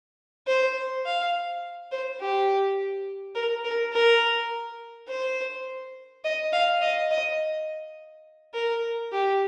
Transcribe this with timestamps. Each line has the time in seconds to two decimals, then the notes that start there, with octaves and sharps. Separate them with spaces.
0.47 C5
1.05 F5
1.91 C5
2.20 G4
3.35 A#4
3.64 A#4
3.93 A#4
5.08 C5
6.24 D#5
6.52 F5
6.81 D#5
7.11 D#5
8.54 A#4
9.12 G4